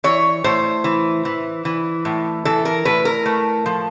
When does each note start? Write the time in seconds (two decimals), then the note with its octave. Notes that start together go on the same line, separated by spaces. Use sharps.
0.04 E3 C#5
0.44 A2 C5
0.84 E3
1.25 E3
1.65 E3
2.05 A2
2.45 E3 A4
2.65 A#4
2.85 A2 B4
3.05 A#4
3.26 A3
3.66 F3